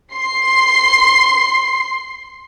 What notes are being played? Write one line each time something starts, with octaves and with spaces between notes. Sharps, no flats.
C6 C7